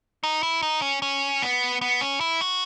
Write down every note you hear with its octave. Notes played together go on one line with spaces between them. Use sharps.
D#4
E4
D#4
C#4
C#4
B3
B3
C#4
E4
F#4